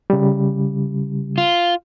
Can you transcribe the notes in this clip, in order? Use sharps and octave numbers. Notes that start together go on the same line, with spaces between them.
C#3 G3
F4